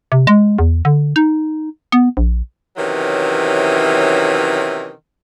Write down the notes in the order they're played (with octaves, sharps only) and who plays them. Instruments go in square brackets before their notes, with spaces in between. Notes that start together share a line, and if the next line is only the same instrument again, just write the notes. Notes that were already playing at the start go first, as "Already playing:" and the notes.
[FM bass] C3
G#3
E2
D3
D#4
B3
A#1
[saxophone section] C3 D#3 E3 F#3 C#4